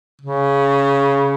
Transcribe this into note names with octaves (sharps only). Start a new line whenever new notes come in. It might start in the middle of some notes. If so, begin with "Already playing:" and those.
C#3